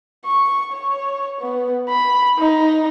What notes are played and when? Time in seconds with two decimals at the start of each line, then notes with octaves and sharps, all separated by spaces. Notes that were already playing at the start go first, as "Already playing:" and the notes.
0.25 C#6
0.73 C#5
1.41 B3
1.90 B5
2.39 D#4